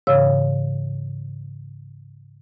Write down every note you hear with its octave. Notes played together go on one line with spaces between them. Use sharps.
G#2 C#3 E3 C#5 F5 E6